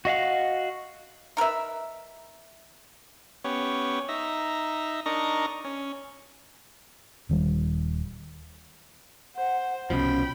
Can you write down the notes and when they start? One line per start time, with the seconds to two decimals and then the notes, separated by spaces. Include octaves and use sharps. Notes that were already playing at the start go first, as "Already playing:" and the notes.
0.05 F#4 D#5 F5 F#5
1.37 D#4 A#4 B4 E5
3.44 B3 C#4 G4 C#5
4.09 D#4 E5 A#5
5.06 D4 D#4 A#4 D#5 A#5 C#6
5.65 C#4
7.29 D#1 D#3 G3
9.36 C5 F#5
9.90 C2 B2 F3 C#4 G5 B5